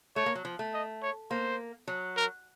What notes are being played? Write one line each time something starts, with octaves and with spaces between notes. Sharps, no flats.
A3 C#5
A#3
F#3
F3
A3
D#5
C#5
A#3 C5
F#3
A#4